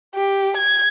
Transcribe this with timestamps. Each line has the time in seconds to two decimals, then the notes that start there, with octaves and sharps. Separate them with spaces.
0.15 G4
0.57 G#6